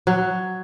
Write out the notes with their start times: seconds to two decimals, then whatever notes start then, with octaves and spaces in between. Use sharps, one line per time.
0.07 F#3